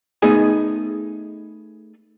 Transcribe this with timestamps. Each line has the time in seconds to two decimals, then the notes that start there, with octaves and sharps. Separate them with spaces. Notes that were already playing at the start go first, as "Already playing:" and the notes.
0.22 A3 B3 D#4 G#4 D#5 G#5